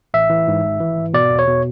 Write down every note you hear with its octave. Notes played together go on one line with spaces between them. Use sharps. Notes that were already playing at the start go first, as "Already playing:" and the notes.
A1 E5
E3
G#2
G#1
E3
G#2
B2 D5
E2
C#5
B2